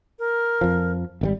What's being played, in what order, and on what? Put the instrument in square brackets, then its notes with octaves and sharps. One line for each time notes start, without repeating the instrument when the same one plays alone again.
[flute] A#4
[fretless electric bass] F2 F3
G#1 D3 G3